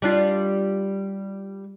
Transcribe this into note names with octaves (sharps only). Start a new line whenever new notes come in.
G3 D4 F4